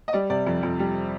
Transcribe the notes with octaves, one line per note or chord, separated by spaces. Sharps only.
D#5
G3 D5
C3 D5
F2
F2
G3